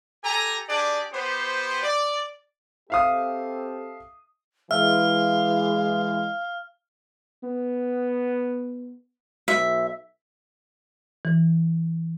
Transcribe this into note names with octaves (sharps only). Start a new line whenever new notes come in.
G4 A4 G#5 A#5
D4 G4 G#4 D5
B3 G4 C5
D5
C4 G4 A4 E5 F5 D#6
E3 G#3 E5 F5 F6
B3
B1 E5
E3